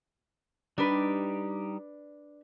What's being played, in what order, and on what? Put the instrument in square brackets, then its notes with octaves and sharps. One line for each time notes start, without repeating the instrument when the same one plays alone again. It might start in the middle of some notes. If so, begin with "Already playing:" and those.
[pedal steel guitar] G3 D#4 G4 [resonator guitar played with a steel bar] D4 B4